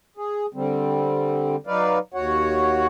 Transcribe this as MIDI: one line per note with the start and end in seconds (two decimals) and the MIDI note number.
0.17 0.46 68
0.54 1.56 50
0.54 1.56 55
0.54 1.56 60
1.67 1.99 54
1.67 1.99 63
1.67 1.99 71
1.67 1.99 74
1.67 1.99 77
2.14 2.87 39
2.14 2.87 66
2.14 2.87 73
2.14 2.87 78